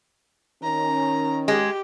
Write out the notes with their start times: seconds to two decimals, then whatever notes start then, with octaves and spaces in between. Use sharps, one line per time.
0.63 D#3 C#4 A#5
1.48 G#3 G4